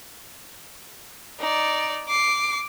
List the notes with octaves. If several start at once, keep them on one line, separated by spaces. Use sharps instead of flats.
D#4 D5
D6 C7